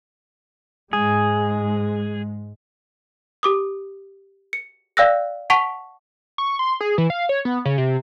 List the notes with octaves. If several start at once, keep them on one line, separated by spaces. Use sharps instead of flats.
G#2 G#3 G#4
G4 D6 D#6
C#7
D5 F5 G5 E6 F#6 A#6
F#5 A5 C#6 B6 D7 F7
C#6
C6
G#4
E3
F5
C#5
B3
C#3
C3